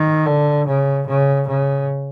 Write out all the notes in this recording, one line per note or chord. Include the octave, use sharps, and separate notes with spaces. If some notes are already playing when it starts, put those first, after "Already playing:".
Already playing: D#3
D3
C#3
C#3
C#3